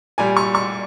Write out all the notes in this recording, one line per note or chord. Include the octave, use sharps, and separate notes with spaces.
A#2 G3 G#5
C#6
C#6